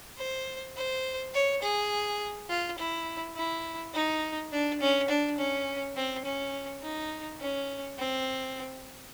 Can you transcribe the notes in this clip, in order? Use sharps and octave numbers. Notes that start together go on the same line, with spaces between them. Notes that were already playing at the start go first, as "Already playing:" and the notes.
C5
C5
C#5
G#4
F4
E4
E4
D#4
D4
C#4
D4
C#4
C4
C#4
D#4
C#4
C4